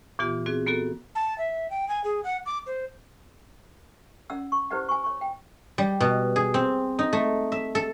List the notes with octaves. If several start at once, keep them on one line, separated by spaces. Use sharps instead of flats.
A#2 E3 B3 F4 G4
C4 F#4 G#4
A#3 B3 F#4 A4
A5
E5
G5
G#5
G#4
F#5
D6
C5
C#4 D5 F#5 E6
C#6
E4 G4 B4 C5 D5 F#5
G#5 C#6
C#5 C#6
G5
G3
B2
G#4
C4
D#4
A3
E5
A4